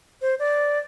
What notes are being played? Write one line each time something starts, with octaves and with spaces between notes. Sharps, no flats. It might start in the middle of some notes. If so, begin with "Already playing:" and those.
C5
D5